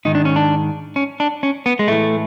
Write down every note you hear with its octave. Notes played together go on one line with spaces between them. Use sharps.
G#2 D#3 D#4
D4
C#4
D4
C#4
D4
C#4
B3
G#3
A2 E3 A3